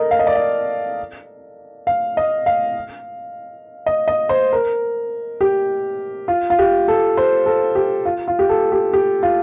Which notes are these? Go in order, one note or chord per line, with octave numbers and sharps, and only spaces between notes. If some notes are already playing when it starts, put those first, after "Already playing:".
Already playing: A4 A#4 D#5
F5
D#5
D5
D#5
F5
D#5
F5
D#5
D#5
C5
A#4
G4
F4
F4
G4
A4
C5
A4
G4
F4
F4
G4
A4
G4
G4
F4